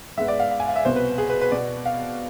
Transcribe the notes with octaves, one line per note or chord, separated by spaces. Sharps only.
G#2 G#3 B3 E5
D5
F5
F5
G#5
F5
E5
C2 B2 B3 C5
B4
G#4
B4
B4
B2 B3 D5
F5